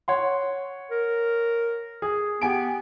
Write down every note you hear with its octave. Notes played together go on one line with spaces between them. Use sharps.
C#5 F#5 C6
A#4
G#4
B3 G4 G#5 D7